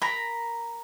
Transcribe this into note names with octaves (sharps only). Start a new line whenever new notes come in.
A#4 A#5 B5